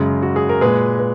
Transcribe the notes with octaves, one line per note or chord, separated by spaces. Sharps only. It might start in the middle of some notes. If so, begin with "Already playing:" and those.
Already playing: F#2 C#3 G#3
F#4
G#4
A#4
A#2 G#3 G#4 B4
B4